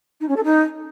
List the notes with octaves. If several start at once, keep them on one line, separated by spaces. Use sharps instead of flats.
D#4
C#4
A4
D#4